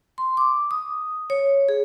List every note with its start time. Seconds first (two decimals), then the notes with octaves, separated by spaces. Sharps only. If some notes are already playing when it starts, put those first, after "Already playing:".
0.18 C6
0.37 D6
0.71 D#6
1.30 C#5
1.69 G#4